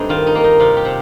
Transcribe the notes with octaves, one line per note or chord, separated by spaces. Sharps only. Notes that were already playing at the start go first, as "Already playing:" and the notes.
Already playing: G2 A3 C4 D#4
D#3 F4
D#4
A#3
D#4
C3 F4
G4
C3